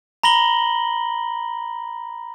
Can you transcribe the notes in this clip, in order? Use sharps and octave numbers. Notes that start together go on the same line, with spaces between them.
A#5 B5 A#6 F#7 G7